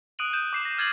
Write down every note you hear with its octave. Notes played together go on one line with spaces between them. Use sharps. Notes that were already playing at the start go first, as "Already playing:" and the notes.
D#6 F#6 D7 D#7 F#7
G6 D#7 E7
D6 C7 E7
A#6
F6 G#6 A6 C7 F#7